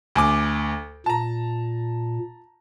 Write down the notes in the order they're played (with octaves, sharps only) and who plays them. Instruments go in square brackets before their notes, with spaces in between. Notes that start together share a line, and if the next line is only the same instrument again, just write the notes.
[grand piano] D2 G#5 D6
[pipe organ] A#2 [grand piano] A5 A#5